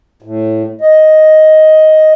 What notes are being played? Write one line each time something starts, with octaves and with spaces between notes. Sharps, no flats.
A2
D#5